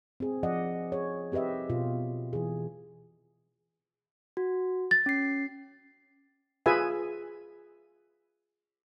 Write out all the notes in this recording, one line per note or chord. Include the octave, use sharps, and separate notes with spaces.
C4 G#4
F3 D5 D#5 F#5
G#4 C#5
C4 G4 B4 D#5 E5
B2 F4
E3 G#4
F#4
A6
C#4 C7
F4 G#4 B4 E5 G#5